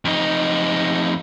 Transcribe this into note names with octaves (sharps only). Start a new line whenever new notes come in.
F2 D#4